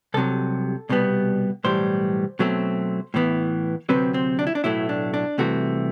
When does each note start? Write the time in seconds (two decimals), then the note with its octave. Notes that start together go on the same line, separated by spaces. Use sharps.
0.14 C2 C3 F#3 A4
0.89 C2 B2 G3 B3
1.64 B1 A2 E3 G3 C5
2.39 B2 F#3 A3 C4
3.14 A2 E3 B3
3.89 D2 C3 F#3 C4 B4
4.14 C4
4.39 D4
4.47 E4
4.55 D4
4.64 B1 A2 F#3 A3 E4
4.89 D4
5.14 D4
5.38 C2 C3 E3 A3 F#4